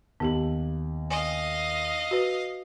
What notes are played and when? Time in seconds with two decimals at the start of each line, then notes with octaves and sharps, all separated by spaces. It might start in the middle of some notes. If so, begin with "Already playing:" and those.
0.20 D#2 B3 G4 F#7
1.11 D#5 F5 G#5
2.11 F#4 B4